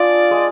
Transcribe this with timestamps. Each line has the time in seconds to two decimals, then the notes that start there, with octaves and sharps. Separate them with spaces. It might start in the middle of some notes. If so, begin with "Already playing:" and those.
Already playing: D4 F4 G#4 D5
0.31 G#3